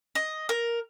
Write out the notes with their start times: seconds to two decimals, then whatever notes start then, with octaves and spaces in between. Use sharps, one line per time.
0.15 D#5
0.49 A#4